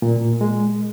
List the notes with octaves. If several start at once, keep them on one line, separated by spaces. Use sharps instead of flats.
A#2
G#3